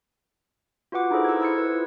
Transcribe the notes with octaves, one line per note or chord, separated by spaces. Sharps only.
F4 F#4 B4 F#5 D6
D#4 E4 G#4 A4 C5
E6 G#6
E4 E6 G#6 C#7
B4
F4